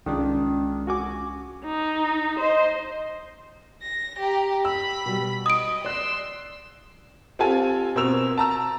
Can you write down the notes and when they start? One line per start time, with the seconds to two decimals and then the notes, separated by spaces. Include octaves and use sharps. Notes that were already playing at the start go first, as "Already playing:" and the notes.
0.06 C2 D#3 G#3 C#4 D4 F4
0.87 F#4 G#5 D6
1.65 D#4
2.40 C5 D#5
3.82 A#6
4.19 G4 A#5
4.65 B5 E6 B6
5.06 B2 G3
5.46 D#5 D#6 D7
5.85 D5 C6 E6 F#6
7.39 C4 F4 G4 A4 G#5
7.95 B2 C4 A#4 E6 F7
8.38 A5 A#5 E6